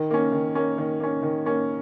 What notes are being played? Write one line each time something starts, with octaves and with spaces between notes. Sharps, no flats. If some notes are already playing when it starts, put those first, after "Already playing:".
Already playing: D#3
A#3 C#4
D#3
A#3 C#4
D#3
A#3 C#4
D#3
A#3 C#4